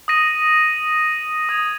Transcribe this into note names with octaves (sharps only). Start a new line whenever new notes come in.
D#6 A#6 D#7
D#6 G#6 F7